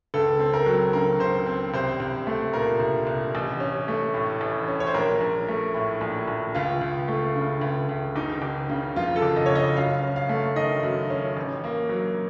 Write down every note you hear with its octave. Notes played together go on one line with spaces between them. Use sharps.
C#2 A4
C4
A#4
F#3
C#3 A#4
C#2 C5
C4
C2 C5
C2
A3
A#2 A#4
C2
C2
A1
C#4
A3
A2
A1
C#4
C#5
C5
A#1 A#4
A#1
A3
A2
A#1
A#1
C#2 F4
C#2
A3
C#3
C#2
C#2
F#1 D#4
F#1
C#3
F2 F4
A4
F#1
D#5
F#1 C#5
D#5
F#2 F5
C#4
F5
A3
D#3 D#5
F#2
C#4
A1
A#3
F#3